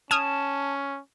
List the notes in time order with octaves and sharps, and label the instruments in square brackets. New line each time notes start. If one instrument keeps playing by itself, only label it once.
[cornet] C#4 [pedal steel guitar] A5 [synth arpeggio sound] D#6 F6 G#6